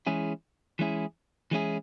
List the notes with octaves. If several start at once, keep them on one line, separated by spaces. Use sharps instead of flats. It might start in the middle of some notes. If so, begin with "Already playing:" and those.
E3 G#3 C#4 E4 G#4
E3 G#3 C#4 E4 G#4
E3 G#3 C#4 E4 G#4